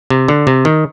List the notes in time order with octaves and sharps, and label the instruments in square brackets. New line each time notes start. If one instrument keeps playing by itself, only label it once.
[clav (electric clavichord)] C3
D3
C3
D#3